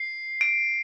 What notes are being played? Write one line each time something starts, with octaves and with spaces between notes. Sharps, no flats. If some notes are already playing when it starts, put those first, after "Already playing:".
Already playing: C7
D7